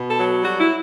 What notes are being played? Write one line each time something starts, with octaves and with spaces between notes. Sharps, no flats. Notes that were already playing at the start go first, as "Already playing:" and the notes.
Already playing: B2
A4
F#3
G3 F#4
E4